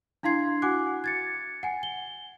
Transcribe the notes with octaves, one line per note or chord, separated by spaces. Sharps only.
D4 E4 F5 C6 G#6 C7
F#4 F#5 G#5 D6 F#6
G#6 A6 C#7
F#5 G#5
G7